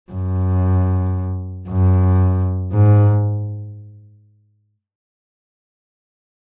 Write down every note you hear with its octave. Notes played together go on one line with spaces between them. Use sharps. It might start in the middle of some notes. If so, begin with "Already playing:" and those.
F#2
F#2
G#2